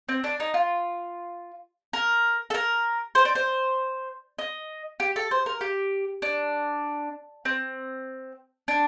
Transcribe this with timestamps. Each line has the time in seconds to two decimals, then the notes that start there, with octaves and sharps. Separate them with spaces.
0.09 C4
0.24 D4
0.40 D#4
0.54 F4
1.93 A#4
2.50 A4
2.54 A#4
3.15 C5
3.25 D5
3.35 C5
4.38 D#5
5.00 G4
5.16 A4
5.31 C5
5.46 A#4
5.61 G4
6.22 D4
7.45 C4
8.68 D4